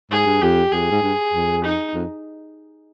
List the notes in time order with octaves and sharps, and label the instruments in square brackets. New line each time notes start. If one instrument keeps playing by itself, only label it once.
[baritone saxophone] G#2 [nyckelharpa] G#4
[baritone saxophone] G2
[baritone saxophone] F2 [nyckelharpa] G4
[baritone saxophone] F2 [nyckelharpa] G#4
[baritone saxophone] G#2
G2
F2
[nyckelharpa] D#4
[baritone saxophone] F2